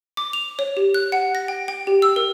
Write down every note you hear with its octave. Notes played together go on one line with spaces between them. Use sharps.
D6
F7
C#5
G4
F#6
F#5
A#6
G5
G5
G4
E6
A#4